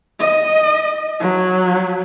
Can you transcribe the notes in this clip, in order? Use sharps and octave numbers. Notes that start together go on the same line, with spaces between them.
D#5
F#3